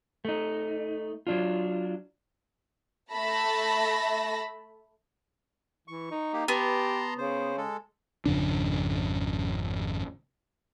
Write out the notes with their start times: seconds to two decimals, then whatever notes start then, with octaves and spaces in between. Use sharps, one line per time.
0.25 A3 D#4
1.27 F#3 D4 F4
3.13 A3 E5 A5 B5 A#6
5.88 E3 C#6
6.11 D#4
6.33 A#3 G4
6.48 B3 G4 A5 A#5 C6
7.18 C#3 C5
7.58 G#3 A4
8.26 G#1 F2 C#3 D4